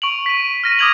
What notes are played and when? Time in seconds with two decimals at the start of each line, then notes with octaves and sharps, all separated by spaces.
0.02 C#6 D7 F7 F#7
0.26 B6 D#7
0.64 F6 A#6 D#7
0.79 D6 D#6 F6 G#6 F7 F#7